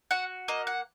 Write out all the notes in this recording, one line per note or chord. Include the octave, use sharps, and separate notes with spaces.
F#4 F#5
A#3 D#5
F#5